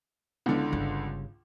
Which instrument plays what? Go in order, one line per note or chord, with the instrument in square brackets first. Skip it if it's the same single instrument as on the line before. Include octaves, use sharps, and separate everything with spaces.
[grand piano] C#2 D3 [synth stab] B3 E4 F4
[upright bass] G1 C#3